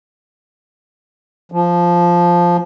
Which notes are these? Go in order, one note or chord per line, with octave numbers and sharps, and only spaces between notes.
F3